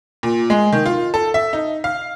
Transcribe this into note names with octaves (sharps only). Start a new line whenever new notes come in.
A#2
G#3
D#3
F4
A4
E5
D#4
F5